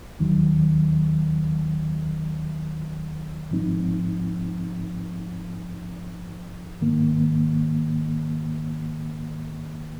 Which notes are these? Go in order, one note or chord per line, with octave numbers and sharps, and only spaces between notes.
D#2 D#3 F#3
G#2 F3 C4 D#4
G#2 D#3 A#3